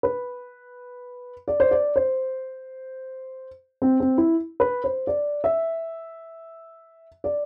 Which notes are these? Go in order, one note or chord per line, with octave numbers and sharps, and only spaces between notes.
B4
D5
C5
D5
C5
C4
C4
E4
B4
C5
D5
E5
D5